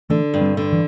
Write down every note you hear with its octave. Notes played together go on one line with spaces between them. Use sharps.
D3 E3 A3
G2
G3 C4
D3
E3